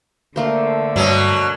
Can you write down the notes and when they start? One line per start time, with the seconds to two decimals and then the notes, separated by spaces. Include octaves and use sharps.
0.36 D3 A3 A#3 C5
0.96 G2 B2 F#3